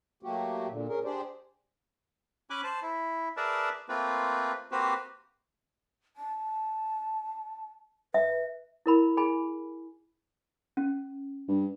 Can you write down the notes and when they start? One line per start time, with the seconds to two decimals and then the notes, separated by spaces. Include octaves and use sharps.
0.23 F#3 A3 A#3 F#4 G4
0.68 A#2 D3
0.88 C#4 G#4 A#4
1.04 D4 G4 G#4 C5 D5
2.50 C#4 G#5 B5 D6 F#6
2.64 C5 A5
2.82 E4
3.37 G#4 A#4 B4 D5 E5 A5
3.89 A3 A#3 C4 F4 B4
4.72 A#3 C4 F#4 G4 B4 C5
6.16 A5
8.14 B4 E5
8.86 E4 A#4 B5
9.17 G#4 G#5 B5
10.77 C#4
11.48 G2